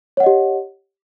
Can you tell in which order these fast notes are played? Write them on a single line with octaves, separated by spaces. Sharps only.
C#5 F#5 D#5 G4